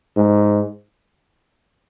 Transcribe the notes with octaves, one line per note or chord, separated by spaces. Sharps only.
G#2